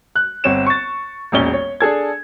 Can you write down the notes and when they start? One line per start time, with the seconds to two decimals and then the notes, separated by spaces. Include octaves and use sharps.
0.16 F#6
0.44 G1 C4 C#5 E7
0.67 C#6 A6
1.32 E1 A#1 C#4 G7
1.53 C#5
1.80 D4 G#4 A4 G#6